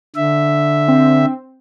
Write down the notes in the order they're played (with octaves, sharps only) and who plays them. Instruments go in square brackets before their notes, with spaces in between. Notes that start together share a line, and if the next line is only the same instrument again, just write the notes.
[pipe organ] D3 E5
[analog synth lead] C4